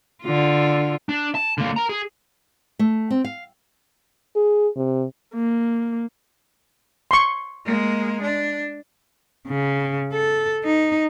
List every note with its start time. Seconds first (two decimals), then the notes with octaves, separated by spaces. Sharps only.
0.23 D3 F4
1.09 D4
1.35 A5
1.58 D3 A#3
1.76 A#4 A#5
1.89 G#4
2.79 A3
3.10 C4
3.25 F5
4.36 G#4
4.77 C3
5.34 A#3
7.11 C6 C#6
7.66 G#3 A#3
8.22 D4
9.48 C#3
10.12 A4
10.65 D#4